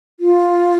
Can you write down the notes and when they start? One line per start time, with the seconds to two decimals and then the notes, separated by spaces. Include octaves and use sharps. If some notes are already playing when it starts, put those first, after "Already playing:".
0.20 F4